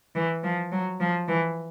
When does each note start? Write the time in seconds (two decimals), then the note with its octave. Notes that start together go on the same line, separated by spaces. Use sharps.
0.15 E3
0.43 F3
0.72 F#3
1.00 F3
1.28 E3